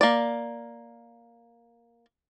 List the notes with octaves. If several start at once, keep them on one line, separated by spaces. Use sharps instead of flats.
A#3 D5